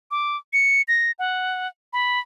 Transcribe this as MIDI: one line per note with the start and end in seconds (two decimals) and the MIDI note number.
0.11 0.36 86
0.53 0.82 97
0.88 1.11 94
1.19 1.68 78
1.93 2.20 83